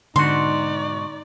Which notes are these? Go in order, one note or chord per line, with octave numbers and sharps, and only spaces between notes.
G#2 B2 D3 D#4 F#4 D5 C6